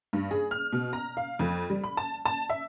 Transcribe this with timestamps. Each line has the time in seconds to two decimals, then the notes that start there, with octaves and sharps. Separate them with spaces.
0.13 G2
0.31 G#4
0.51 F6
0.72 B2
0.93 A#5
1.17 F5
1.39 F2
1.70 G3
1.84 B5
1.97 A5
2.25 A5
2.50 E5